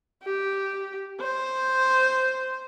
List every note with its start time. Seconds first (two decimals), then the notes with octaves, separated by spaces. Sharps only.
0.23 G4
1.20 C5